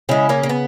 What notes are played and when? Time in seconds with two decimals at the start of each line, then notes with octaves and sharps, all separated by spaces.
0.09 C#3 G#3 C#4 E4
0.29 A#3 C#4
0.43 A#3
0.49 B3